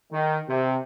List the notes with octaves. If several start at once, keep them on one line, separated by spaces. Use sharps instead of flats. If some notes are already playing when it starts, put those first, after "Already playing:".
D#3
C3